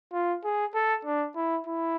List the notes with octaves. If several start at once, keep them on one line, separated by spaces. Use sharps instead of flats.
F4
G#4
A4
D4
E4
E4